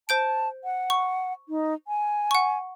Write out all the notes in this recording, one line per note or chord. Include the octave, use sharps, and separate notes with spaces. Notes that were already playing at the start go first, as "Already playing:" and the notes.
C5 A5 G6 D7
F#5
C#6
D#4
G#5
F#5 C#6